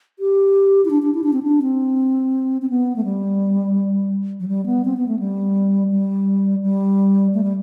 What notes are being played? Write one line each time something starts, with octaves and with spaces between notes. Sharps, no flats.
G4
E4
D4
D4
E4
D4
C4
D4
C4
C4
B3
A3
G3
F#3
G3
B3
C4
B3
A3
G3
G3
G3
A3
G3